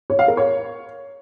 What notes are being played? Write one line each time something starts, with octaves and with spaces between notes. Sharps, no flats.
C#5
F5
A#4
C#5